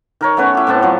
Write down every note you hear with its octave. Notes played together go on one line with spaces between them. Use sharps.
D#3 A#4 C#5
A3 B3 C#4 B4
E4 G4
A2 B3 C4 A5
F3 F#3